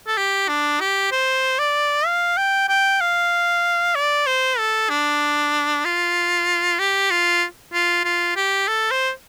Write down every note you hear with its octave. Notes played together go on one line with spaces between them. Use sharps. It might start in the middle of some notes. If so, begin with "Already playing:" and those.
A4
G4
D4
G4
C5
D5
F5
G5
G5
F5
D5
C5
A4
D4
F4
G4
F4
F4
F4
G4
A4
C5